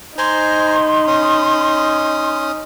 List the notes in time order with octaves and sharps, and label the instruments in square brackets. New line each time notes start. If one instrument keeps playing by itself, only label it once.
[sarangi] D#4 [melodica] C5 G#5 A#5 [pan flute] C6
[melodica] C#4 D#6